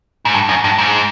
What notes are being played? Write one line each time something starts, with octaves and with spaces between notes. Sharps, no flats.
G#2
G2
F#2
G2
G#2